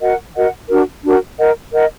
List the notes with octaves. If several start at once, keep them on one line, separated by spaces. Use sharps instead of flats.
F#4 A#4 D#5 F#5
F#4 A#4 D#5 F#5
D4 F#4 A#4
D4 F#4 A#4
A#4 D#5 F#5
A#4 D#5 F#5